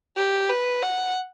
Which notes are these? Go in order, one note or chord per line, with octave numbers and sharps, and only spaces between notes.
G4
B4
F#5